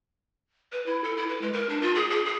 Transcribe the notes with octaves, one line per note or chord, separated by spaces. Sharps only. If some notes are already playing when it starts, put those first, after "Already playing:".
B4
E4
A4
E4
B4
G#3
A#4
D4
F4
G#4
G#4
G#4